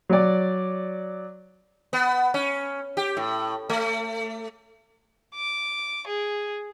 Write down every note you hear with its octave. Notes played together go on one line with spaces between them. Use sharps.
F#3 D5
B3
C#4
G4
A2
A3
D6
G#4